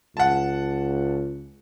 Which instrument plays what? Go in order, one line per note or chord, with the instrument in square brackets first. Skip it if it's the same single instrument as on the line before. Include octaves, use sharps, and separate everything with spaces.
[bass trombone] C#2 [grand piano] F#5 A5